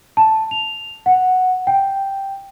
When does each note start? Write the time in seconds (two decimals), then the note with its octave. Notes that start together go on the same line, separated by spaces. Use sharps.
0.17 A5
0.51 F7
1.06 F#5
1.67 G5